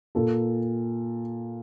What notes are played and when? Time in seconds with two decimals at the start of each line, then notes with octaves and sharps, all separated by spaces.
0.15 A#2 A4